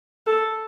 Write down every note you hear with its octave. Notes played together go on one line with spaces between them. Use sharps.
A4